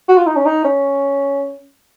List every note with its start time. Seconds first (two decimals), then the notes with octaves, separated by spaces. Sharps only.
0.09 F#4
0.17 F4
0.27 D#4
0.36 C#4
0.46 D#4
0.64 C#4